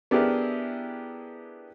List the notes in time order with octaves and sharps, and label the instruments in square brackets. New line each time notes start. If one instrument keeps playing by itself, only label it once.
[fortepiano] B3 D4 E4 G4 G#4 A#4